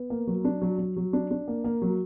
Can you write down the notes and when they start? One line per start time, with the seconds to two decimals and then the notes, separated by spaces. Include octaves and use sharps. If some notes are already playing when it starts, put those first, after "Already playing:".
Already playing: B3
0.10 A#3
0.27 F#3
0.45 D4
0.62 F#3
0.78 F#3
0.97 F#3
1.13 D4
1.31 D4
1.48 A#3
1.64 A#3
1.82 F#3